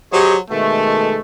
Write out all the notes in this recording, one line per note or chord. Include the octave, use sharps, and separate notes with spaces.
F#3 G4 G#4 C5 C#5 D#5
B2 D#3 G#3 A3